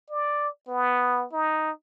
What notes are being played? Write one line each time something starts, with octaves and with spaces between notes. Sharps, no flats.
D5
B3
D#4